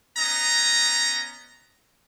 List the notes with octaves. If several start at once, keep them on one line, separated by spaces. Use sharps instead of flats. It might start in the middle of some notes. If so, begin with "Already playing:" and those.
B3 C#4 D#5 A#5